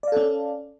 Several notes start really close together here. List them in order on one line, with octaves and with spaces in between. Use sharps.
D5 F5 A4 C#4